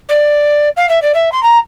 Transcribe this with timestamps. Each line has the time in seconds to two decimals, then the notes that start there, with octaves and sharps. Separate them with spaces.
0.09 D5
0.77 F5
0.89 E5
1.02 D5
1.14 E5
1.32 C6
1.43 A#5